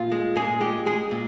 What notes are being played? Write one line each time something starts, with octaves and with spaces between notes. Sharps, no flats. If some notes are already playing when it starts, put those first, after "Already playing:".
Already playing: A#2 F4
G#3
A#2 G#4
G#3 G4
G#3 G#4
A#2